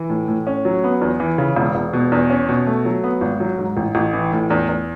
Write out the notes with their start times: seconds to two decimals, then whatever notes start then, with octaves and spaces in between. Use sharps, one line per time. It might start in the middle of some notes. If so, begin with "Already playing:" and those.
Already playing: E3
0.10 A2
0.28 A2
0.47 C#4
0.65 F#3
0.84 B3
1.01 E2
1.20 E3
1.38 C#3
1.56 E1
1.75 E1
1.93 B2
2.12 E2
2.30 C#4
2.49 B2
2.67 A3
2.85 F#3
3.04 B3
3.21 G#1
3.40 F#3
3.58 G#2
3.77 A1
3.95 A1
4.13 E3
4.32 A2
4.50 E2
4.69 E2